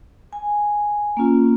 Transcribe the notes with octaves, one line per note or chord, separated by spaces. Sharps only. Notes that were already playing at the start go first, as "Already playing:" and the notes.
G#5
A#3 C#4 F4